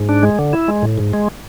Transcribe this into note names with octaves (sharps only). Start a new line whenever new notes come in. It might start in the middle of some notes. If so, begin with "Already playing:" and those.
Already playing: G#2
D4
G#3
D3
E4
G#3
A2
G#2
G#3